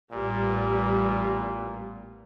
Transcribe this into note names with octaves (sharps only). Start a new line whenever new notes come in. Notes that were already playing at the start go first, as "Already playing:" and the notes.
A1 A#2 G3 B3